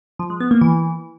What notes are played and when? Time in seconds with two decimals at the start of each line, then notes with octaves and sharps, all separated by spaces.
0.19 F3
0.30 G#3
0.40 B3
0.51 A#3
0.61 E3